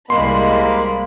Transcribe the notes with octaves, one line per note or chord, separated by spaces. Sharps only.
C2 G#3 A#3 B5 C6